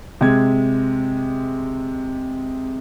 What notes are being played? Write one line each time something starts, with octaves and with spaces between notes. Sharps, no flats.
C3 G#3 G#6